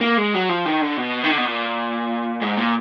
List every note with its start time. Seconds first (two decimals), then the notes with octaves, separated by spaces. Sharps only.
0.01 A#3
0.18 G#3
0.34 F#3
0.49 F3
0.66 D#3
0.81 D3
0.98 B2
1.24 D#3
1.31 D3
1.38 B2
1.45 A#2
2.42 G#2
2.57 A#2